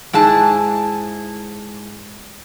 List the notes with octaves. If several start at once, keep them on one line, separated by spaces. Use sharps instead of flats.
G#2 E4 G#4 A5